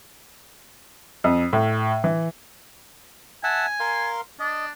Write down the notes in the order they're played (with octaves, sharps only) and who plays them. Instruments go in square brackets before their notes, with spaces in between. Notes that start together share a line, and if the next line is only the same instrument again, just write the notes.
[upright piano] F2
A2
E3
[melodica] E5 F#5 A5 [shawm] G#5
[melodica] A#4 F5 C6
[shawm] D4 [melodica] D#5